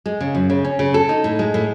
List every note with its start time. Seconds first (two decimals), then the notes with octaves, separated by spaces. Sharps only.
0.06 G#3
0.21 C#3
0.35 F#2
0.50 C#3
0.64 C#4
0.79 C#3
0.94 A4
1.09 D#4
1.24 A2
1.39 G#3
1.54 A2